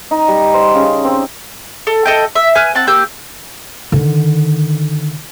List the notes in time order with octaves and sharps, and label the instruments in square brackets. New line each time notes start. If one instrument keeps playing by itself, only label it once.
[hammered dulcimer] D#4
G3
C5
C#3
C4
[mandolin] A4
A4 D#5 G5
E5
B4 G#5 F6 F#6
C4 F#5 A5
A#3 G4 E6 G6
[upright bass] D3 D#3